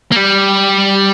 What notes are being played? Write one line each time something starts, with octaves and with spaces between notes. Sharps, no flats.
A#3
G3